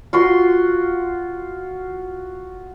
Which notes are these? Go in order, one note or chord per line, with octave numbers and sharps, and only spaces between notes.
F4 F#4 C6